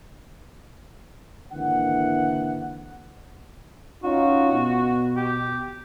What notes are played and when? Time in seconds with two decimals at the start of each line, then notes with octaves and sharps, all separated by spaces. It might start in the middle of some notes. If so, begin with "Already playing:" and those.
1.52 G#1 D3 E3 A#3 F#5
4.04 C#4 D#4 F4 F#4
4.54 B2
5.16 G4